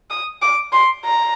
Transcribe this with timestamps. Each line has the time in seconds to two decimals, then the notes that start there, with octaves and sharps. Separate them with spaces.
0.10 D#6
0.42 D6
0.73 C6
1.05 A#5